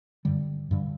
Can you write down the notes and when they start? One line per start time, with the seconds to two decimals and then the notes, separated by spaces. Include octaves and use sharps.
0.25 G2 D3 G3
0.71 G2 D3 G3